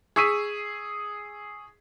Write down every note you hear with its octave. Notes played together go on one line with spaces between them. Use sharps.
G#4 C#6 E6 B6 D#7